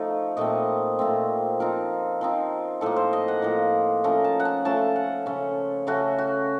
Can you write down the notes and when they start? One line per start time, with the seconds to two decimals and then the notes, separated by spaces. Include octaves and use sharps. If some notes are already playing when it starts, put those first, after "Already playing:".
Already playing: F3 A3 D#4
0.37 A#2 A3 C4 D#5
0.99 A#2 A3 C4
1.60 F3 C4 D#4 A#4
2.21 F3 C4 D#4
2.81 A2 F3 A#3 A4
2.96 C5
3.13 D#5
3.28 F#5
3.42 A2 F3 A#3
4.04 F3 A3 C#4 A#5
4.24 A5
4.40 F#5
4.45 A5
4.65 F3 A3 C#4 A5
4.96 F#5
5.26 C#3 A3 C#4
5.87 C#3 A3 C#4 F#4
6.18 F#4